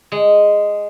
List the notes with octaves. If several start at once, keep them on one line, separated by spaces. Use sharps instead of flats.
G#3